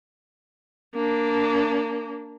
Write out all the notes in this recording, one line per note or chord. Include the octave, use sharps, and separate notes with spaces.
A#3 D4